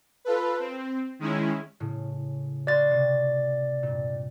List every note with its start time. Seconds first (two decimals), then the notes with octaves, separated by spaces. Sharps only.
0.25 F4 A4 B4
0.59 C4
1.19 D#3 G#3 C#4 E4
1.80 A2 C#3
2.67 F#4 D5 F5 C6 A6
2.91 C3
3.83 G2 A#2